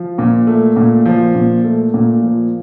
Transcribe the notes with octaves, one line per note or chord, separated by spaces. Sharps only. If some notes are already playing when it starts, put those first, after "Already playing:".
Already playing: F3
A#2
A3
A#2
F3
A#2
A3
A#2
F3